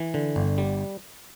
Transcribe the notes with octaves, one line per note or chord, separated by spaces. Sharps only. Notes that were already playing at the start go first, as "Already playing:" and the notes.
Already playing: E3
D3
G1
G3